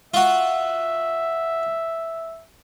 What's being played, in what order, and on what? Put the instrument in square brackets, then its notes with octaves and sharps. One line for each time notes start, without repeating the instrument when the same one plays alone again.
[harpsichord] F4 F#4 [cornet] E5